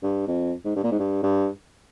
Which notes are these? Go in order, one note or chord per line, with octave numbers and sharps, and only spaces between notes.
G2
F2
G#2
G2
A#2
G#2
G2
G2